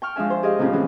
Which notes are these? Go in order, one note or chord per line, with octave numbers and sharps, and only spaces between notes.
G5 C#6 F6
F3 G#3 D4 E5 G#5
C5
G4 G#4 D#5 F5
A2 C3 F3 C#4 F4
C3 E3 F#3 C#4 G#4